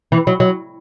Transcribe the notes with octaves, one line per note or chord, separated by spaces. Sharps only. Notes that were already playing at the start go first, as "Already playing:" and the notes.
E3
F#3
F#3